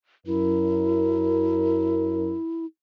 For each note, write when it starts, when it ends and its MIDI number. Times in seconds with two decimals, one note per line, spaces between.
0.27 2.34 42
0.27 2.65 64
0.27 2.34 70